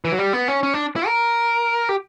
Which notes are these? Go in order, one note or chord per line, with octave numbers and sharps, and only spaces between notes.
E3
F#3
G3
B3
C#4
C#4
D4
E4
A#4
G4